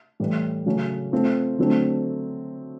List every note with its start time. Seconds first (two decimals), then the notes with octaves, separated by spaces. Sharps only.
0.20 A2 E3 G3
0.66 C#3 F#3 A3 C#4
1.12 A3 C4 F4
1.58 D3 F#3 A3 C4